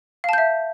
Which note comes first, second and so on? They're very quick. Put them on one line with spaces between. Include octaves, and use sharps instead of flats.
F5 A5 G6 E5